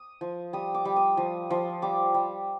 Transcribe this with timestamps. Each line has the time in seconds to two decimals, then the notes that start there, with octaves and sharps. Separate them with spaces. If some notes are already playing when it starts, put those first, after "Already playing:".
Already playing: D#6
0.21 F3
0.53 G3 D#6
0.74 D6
0.85 G3
0.96 D#6
1.17 F3 D#6
1.50 F3
1.82 G3 D6
2.14 G3